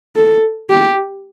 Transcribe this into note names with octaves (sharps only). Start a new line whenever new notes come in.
A4
G4